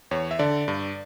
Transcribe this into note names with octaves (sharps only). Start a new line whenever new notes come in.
E2 C#5
E5
D3 D5
G2